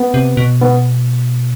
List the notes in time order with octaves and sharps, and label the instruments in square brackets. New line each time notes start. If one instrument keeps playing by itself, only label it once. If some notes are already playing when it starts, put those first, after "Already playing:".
Already playing: [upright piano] B3
[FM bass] C3
B2
[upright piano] B3